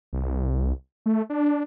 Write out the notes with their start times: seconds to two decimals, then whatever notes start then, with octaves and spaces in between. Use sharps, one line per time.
0.13 C2
1.06 A3
1.30 D4